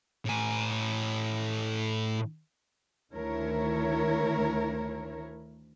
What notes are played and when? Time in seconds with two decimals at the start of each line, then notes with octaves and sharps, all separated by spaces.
0.26 A2 G#5
3.12 D2 D#3 A3 E4 A#4 C#5